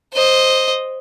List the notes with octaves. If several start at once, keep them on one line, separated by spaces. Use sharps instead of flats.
C5 D#5